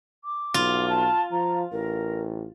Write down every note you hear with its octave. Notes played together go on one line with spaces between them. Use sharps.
D6
B1 F4
A5
F3 A#5
A1 A#4